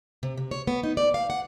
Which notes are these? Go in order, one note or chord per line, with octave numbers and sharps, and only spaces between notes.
C3
C3
C#5
B3
D#4
D5
F5
F#5